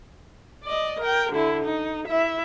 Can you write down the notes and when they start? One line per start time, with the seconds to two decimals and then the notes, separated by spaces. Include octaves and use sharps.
0.64 D5 D#5
1.01 A#4 G5
1.32 D3 E4
1.65 D#4
2.08 E4 E5